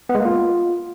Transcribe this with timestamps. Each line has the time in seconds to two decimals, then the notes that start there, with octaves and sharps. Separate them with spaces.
0.09 B3
0.15 G#3
0.20 A#3
0.25 F4